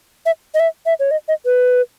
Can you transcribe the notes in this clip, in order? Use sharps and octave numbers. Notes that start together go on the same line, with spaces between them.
E5
D#5
E5
E5
C#5
D#5
D#5
B4